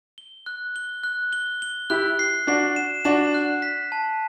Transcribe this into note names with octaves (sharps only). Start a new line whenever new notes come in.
G7
F#6
G7
F#6
G7
G7
E4 G4 F#6
C7
D4 F#4 C7
E7
D4 F#4 E7
F#6
B6
A5